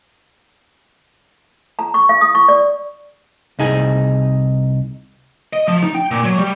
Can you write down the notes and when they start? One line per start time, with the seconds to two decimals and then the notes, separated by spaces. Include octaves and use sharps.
1.79 A#5
1.94 C#6
2.09 F5
2.21 D#6
2.35 C#6
2.48 D5
3.59 C2 D#4 G#4
5.53 D#5
5.68 F3
5.83 D#4
5.95 G5
6.11 A#2
6.25 F#3
6.39 G3